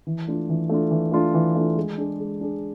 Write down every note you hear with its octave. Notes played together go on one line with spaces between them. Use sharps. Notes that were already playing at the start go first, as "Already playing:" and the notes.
E3
A3 D4 F4
E3
A3 D4 F4
E3
A3 D4 F4
E3
A3 D4 F4
G#3
D4 G#4
G#3
D4 G#4